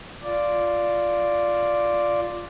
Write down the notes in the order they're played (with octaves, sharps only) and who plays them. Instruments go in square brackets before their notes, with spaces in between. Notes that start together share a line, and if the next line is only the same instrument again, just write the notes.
[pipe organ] F4 D5